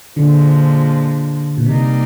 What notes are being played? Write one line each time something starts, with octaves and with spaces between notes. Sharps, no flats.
A#2 D3 F3 G#3 D4
A#2
C3 G3 A#3 D#4 A#4 D5